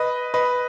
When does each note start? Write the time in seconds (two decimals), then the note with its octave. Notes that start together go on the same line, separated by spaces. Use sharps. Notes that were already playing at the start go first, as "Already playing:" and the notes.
Already playing: B4 D#5
0.34 B4 D#5